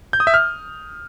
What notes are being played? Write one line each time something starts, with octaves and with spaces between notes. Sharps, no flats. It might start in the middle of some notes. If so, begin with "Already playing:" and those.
G6
D#6
E5
F6